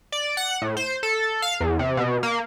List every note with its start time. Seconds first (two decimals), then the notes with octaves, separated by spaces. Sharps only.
0.12 D5
0.37 F#5
0.62 A2
0.77 C5
1.03 A4
1.42 F5
1.61 E2
1.79 C3
1.97 B2
2.23 A#3